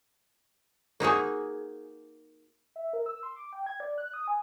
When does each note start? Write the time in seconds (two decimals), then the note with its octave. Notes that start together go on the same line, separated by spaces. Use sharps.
1.00 A#3 D#4 F#4 G#4
2.76 E5
2.93 A#4
3.06 E6
3.23 C6
3.36 D6
3.53 G5
3.66 G#6
3.80 D5
3.98 F#6
4.14 D#6
4.28 G#5